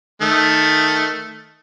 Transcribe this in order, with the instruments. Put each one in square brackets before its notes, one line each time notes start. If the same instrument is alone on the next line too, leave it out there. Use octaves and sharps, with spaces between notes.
[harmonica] D#3 A3